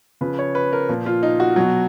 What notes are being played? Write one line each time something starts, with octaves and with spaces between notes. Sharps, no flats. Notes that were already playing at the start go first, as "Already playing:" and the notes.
C#3 F3 B4
C#5
B4
A#4
A#2 F3
F4
D#4
F#4
B2 F#3